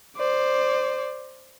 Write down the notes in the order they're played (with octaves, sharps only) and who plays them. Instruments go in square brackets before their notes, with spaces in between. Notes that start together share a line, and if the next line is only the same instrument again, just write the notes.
[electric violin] C5 D5